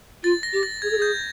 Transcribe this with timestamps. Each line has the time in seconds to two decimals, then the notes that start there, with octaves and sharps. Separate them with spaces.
0.23 F4 A6
0.43 A#6
0.52 G4
0.63 A6
0.82 G#4 G#6
0.90 A4
0.97 G#4 G6